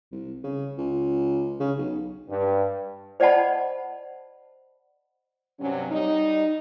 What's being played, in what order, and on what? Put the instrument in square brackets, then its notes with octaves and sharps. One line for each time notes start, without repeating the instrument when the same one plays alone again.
[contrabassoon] C2
C#3
C#2
C#3
B1
[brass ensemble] G2
[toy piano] C5 D5 D#5 F#5 A5 B5
[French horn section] G2 C3 F#3 C#4
G3 D#4